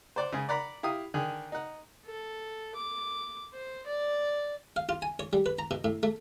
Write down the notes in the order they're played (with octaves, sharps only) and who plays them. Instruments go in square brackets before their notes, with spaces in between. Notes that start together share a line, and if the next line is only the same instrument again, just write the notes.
[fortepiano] C5 D5 F#5
C#3 G#3 G#4
D5 F#5 A#5 B5
E4 G4 F5 D#6
D3 D#3 G#4
D#4 F#5
[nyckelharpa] A4
D6
C5
D5
[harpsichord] F5
F4
G#5
C#5
G3
B4
A#5
B2
A2
A3